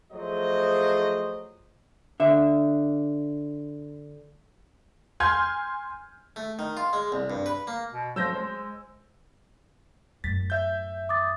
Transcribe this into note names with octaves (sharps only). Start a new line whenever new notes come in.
F3 F#3 A3 G#4 C5 D#5
D3 E5
G#5 C6 F6 G6 G#6
A3
D#3
F4
G#3
C2
G2
B4
A#3
B2
F3 F#3 A3 C#4 E6 G6 A#6
G#3 C5
F#2 A2 A6 B6
E5 G6
D6 D#6 A6